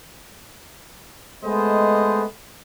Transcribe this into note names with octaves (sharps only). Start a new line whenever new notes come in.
G#3 A3 B3 C5 D#5